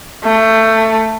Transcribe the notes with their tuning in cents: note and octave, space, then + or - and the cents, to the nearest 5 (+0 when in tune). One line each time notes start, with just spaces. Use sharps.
A3 +20